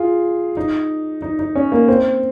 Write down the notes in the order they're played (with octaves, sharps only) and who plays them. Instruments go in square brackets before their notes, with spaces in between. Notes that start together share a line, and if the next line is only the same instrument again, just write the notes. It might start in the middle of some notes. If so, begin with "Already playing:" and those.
Already playing: [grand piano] F4 G#4
D#4
D#4
D#4
C#4
A#3
C4